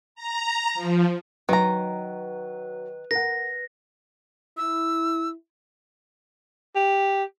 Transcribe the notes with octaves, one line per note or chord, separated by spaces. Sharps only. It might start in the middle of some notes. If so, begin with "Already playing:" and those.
A#5
F3
D#3 F#3 B4 A#5
A#4 F#5 A#6
E4 E6
G4